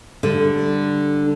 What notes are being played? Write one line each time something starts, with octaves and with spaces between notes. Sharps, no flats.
D3 G3